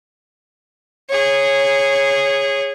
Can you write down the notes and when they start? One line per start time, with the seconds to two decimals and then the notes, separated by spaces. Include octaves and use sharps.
1.09 G#4 C#5